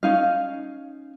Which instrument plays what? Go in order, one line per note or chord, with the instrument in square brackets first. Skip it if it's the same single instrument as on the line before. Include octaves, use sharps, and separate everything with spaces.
[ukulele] C#4 D#4 F5